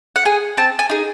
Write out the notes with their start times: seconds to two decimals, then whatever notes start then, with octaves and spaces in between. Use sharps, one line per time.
0.16 F#5
0.25 G#4 G#5
0.57 C4 A5
0.79 G#5
0.90 D#4 G#4